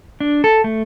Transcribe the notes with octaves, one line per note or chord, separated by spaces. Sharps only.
D4
A4
A3